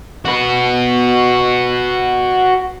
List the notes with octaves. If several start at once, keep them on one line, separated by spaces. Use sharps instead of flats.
F#4 B4